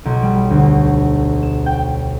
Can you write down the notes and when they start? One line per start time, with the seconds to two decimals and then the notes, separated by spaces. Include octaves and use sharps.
0.05 B1
0.23 G3
0.50 D2
1.43 E7
1.66 G5